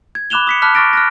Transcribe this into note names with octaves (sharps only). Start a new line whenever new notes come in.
G#6
B5 D6 F#6 E7 F7 G7
D#6 B6 C#7
A5 B5 D6 F6 F#6 B6
C#6 D6 F6 A6 A#6 D7
F6 F#6 A#6